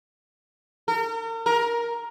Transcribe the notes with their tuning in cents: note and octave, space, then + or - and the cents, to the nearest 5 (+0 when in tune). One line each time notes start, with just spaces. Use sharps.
A#4 -40
A#4 +10